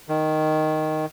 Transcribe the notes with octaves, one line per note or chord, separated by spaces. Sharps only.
D#3